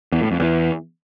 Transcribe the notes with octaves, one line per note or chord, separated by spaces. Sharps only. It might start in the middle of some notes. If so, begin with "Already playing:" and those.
E2
A2
F2
E2